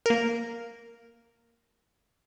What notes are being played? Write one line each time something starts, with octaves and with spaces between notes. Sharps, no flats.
A#3 A#4